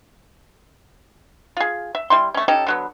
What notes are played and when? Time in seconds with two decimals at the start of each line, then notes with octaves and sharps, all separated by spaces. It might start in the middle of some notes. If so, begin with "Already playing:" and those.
1.57 F4 G#4
1.95 E5
2.10 G3 E4 C6
2.34 A3 C#4
2.48 C#4 D#4 G4 A4
2.67 D3 F#3 B3